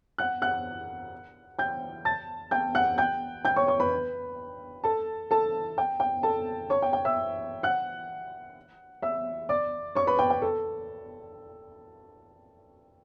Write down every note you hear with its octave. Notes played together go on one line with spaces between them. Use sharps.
F#5 F#6
F#5 F#6
G5 G6
A5 A6
G5 G6
F#5 F#6
G5 G6
G5 G6
C#5 C#6
C#5 C#6
B4 B5
A4 A5
A4 A5
G5
G5
A4 A5
C#5 C#6
G5
G5
E5 E6
F#5 F#6
E5 E6
D5 D6
C#5 C#6
B4 B5
G5
G5
A4